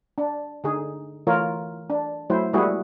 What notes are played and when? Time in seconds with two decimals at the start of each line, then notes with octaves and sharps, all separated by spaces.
0.18 D4
0.64 D3 D#4 G#4
1.27 E3 A3 F4 A#4 C#5
1.90 D4
2.30 F#3 A3 E4 C5
2.53 G3 G#3 A#3 E4 F#4 G#4